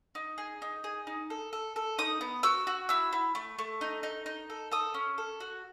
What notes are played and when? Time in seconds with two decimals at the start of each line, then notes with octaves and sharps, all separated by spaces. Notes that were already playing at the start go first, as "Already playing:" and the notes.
0.15 D#4
0.38 G#4
0.62 D#4
0.84 G#4
1.07 D#4
1.30 A4
1.53 A4
1.76 A4
1.98 D#4 D#6
2.21 B3
2.43 F#4 E6
2.67 F#4
2.89 E4 E6
3.13 E4
3.35 A3
3.59 A3
3.81 D#4
4.03 D#4
4.26 D#4
4.50 A4
4.72 A4 D#6
4.94 C#4
5.18 A4
5.40 F#4